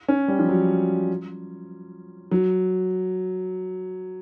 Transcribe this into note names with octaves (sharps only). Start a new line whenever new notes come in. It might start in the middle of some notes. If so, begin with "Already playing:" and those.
C#4
G3
F3
F#3
F#3